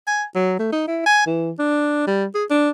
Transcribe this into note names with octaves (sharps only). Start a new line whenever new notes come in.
G#5
F#3
A3
D#4
E4
G#5
E3
D4
G3
G#4
D4